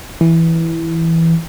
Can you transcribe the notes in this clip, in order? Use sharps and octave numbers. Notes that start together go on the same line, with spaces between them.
E3